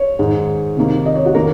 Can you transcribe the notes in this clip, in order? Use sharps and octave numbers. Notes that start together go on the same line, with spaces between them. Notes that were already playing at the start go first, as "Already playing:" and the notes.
Already playing: C#5
G#2 D#3 G#3 D#4
C3 D#3 A#3 D#4
D#5
C#5
F#4
D#3 A#3 C#4 A#4